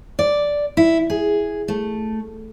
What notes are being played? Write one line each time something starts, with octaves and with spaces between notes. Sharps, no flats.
D5
E4
G#4
A3